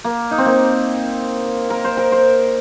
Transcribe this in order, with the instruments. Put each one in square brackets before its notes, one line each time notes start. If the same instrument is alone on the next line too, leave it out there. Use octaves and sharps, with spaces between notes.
[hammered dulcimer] A#3
D#4
C4
A#3
A#4
C5
A#4
C5